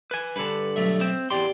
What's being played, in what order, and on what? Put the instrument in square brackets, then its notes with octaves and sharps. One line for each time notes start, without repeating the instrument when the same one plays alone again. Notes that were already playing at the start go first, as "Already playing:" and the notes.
[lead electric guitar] B4 G#5
[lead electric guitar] G2 D3 [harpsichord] B4 A5
[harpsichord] B1 A3 E5
[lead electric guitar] C4
[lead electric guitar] E2 C6 [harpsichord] G4 D5